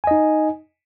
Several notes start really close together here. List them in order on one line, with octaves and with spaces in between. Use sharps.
G#5 D#5 D#4